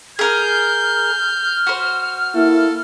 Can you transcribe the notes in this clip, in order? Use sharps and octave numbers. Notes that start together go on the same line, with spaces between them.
G#4 A#4 F6 G6
F#4 C5
A#3 E4 A4